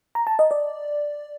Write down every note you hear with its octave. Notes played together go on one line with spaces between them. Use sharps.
A#5
A5
D#5
D5